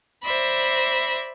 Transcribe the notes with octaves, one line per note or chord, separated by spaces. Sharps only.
C5 D5 E5 B5 A#6